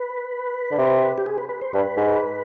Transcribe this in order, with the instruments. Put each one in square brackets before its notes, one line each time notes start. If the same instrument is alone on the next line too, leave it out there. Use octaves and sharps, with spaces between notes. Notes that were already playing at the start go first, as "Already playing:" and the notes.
Already playing: [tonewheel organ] B4
[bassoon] D3
C3
[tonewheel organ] G4
G#4
B4
B4
C5
[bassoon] G2 [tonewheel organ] B4
[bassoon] G#2